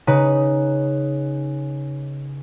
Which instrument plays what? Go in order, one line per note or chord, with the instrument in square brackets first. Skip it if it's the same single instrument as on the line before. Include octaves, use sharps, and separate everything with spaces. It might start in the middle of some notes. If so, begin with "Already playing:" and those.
[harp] C#3 D#4 B4